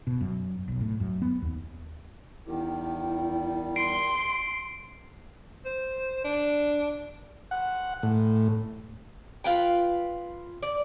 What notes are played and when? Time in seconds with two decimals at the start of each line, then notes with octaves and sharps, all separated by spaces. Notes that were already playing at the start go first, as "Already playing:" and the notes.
0.07 B2
0.21 F#2
0.68 B1
0.81 A2
1.00 F#2
1.22 B3
1.42 D#2
2.46 E2 D#3 G3 E4
3.76 C6 C7 D7
5.65 C5
6.24 D4
7.51 F#5
8.03 A2
9.44 F4 B4 G5
10.63 D5